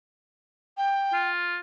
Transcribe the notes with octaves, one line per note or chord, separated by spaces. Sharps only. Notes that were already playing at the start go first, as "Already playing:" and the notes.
G5
F4